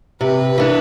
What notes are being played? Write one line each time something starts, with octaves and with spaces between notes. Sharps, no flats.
C3 B4
E3 B3 D4